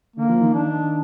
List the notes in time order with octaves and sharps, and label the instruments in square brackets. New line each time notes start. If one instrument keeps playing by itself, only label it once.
[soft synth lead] D3 [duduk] A#3
[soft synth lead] F3
D#3
[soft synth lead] D#3 [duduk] D4